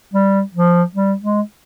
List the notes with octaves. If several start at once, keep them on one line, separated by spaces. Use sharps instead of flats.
G3
F3
G3
G#3